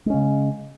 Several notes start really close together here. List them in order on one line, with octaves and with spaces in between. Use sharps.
G#3 C#4 C#3